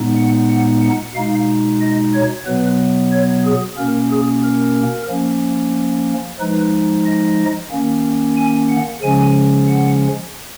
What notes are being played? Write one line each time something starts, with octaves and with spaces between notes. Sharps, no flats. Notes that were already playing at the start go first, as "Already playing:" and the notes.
Already playing: A#2 G#3 B3 D#4
F#5
F#5
F#5
B2 G#3 D#4 F5
D#5
C#5
B2 F#3 B3 B4
C#5
G#4
B2 A#3 C#4 A#4
G#4
A#4
F3 A#3 C#4
F3 G#3 D#4 B4
D#5
D#3 A#3 C#4
G#5
F#5
C#3 F3 G#3 C#4 G#5
F#5